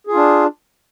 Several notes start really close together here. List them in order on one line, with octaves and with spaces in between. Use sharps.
G#4 F4 D4